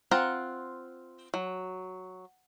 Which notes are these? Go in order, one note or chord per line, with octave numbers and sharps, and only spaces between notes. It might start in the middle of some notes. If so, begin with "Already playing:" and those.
C4 F4 F#5 A#5
F#3